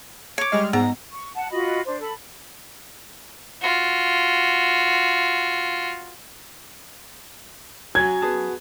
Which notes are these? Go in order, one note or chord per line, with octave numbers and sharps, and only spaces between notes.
C#5 D6
G3 G#3 D#5 F6
G#2 B3 G#4 F#5 A#5
C#6
F#5 A5
F4 F#4 D#5 B5
D4 C5
A4 B5
F4 F#4
F#2 F#3 F#4 G#5 G#6
B3 G#4 A5